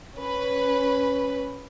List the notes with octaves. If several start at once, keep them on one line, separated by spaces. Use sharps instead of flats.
C#4 B4